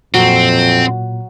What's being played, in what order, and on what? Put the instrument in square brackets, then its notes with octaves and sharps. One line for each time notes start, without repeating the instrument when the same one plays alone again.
[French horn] F2 [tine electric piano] A#2 [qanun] F#3 [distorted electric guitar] C4